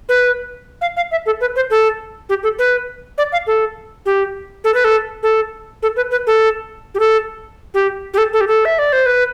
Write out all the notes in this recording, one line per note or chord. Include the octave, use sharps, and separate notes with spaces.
B4
F5
F5
E5
A4
B4
C5
A4
G4
A4
B4
D5
F5
A4
G4
A4
B4
A4
A4
A4
B4
B4
A4
G4
A4
G4
G4
A4
A4
G4
A4
E5
D5
C5
B4